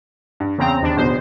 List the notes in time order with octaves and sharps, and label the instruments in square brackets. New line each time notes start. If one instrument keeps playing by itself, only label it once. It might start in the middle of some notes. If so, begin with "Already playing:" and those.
[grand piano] G2
[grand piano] E2 G5 [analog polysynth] C#3 C4 A#5
[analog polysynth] D#2 D4
[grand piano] D1 B1 B2 [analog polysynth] C5